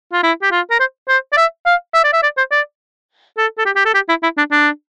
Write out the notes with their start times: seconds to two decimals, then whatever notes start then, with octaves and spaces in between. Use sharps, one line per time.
0.12 F4
0.23 E4
0.42 G4
0.52 F4
0.70 A#4
0.80 C5
1.08 C5
1.33 D5
1.37 E5
1.66 F5
1.94 E5
2.04 D5
2.13 E5
2.23 D5
2.37 C5
2.52 D5
3.38 A4
3.58 A4
3.65 G4
3.76 G4
3.85 A4
3.94 G4
4.09 E4
4.23 E4
4.37 D4
4.51 D4